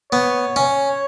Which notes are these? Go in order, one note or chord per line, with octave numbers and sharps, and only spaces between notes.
B3 C#5
C#4